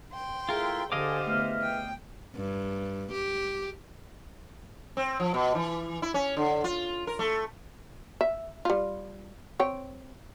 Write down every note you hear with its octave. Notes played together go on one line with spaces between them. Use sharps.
G5 C6
A3 E4 F4 G#4 A#4
D3 G4 A4 C5 D#5 F5 G#5 D6
E2 A3 B3 E5 F6
G5
G2
G4
C4
F3
B2
E3
E4
C#4
D3
F4
A#4
A3
E5
G3 F4
C4 C#5 G5